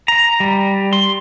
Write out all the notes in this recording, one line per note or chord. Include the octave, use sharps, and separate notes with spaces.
A#5
G3
C6